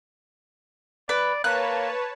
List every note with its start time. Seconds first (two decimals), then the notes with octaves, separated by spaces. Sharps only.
1.09 B4 D5
1.44 A#3 B4 C#5 A5 F#6